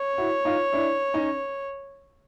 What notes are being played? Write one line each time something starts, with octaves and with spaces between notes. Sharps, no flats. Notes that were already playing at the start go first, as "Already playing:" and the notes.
Already playing: C#5
E4 F#4
D#4 F4
D4 E4
C#4 D#4